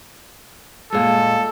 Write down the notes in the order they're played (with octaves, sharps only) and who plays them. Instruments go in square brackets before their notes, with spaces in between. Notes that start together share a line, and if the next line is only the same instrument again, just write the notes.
[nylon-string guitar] A#2 G#3 [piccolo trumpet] A4